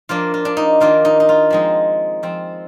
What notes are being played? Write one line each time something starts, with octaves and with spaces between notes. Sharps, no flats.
F3 A#3 D4 F4
F4
D4
D#4
D#3 A#3 D4 F4
D#4
D#4
F4
F3 G#3 C4 D#4
F3 C4